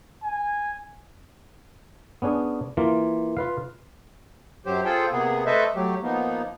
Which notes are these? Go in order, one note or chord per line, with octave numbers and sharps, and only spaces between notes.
G#5
B3 C#4 D4 G#4
E3 A#3 F4
F4 B4 F5
F#2 F#3 G4 C5
F4 G#4 A4 C5 G5
C3 A#3 B3 G#4
A3 A4 B4 C5 D#5 E5
F#3 A3 G4
F3 A#3 B3 D#4